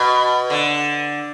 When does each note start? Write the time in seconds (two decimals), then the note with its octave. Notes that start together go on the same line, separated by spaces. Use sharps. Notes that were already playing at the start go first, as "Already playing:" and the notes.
Already playing: B2
0.50 D3